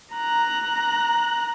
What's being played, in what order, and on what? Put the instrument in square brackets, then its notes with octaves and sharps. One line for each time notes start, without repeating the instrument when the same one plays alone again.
[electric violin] A#5 F#6